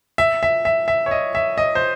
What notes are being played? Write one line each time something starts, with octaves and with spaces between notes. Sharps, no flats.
E5
E5
E5
E5
C#5
D#5
E5
D#5
C5